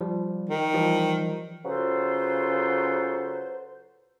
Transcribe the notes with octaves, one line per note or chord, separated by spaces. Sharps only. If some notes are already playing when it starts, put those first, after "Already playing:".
F3 G3
D#3
E3 F3 G3
C#3 F#3 F4 A4 B4 C5